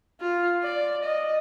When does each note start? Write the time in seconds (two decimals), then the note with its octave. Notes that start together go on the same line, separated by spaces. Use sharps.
0.20 F4
0.64 D5
1.04 D#5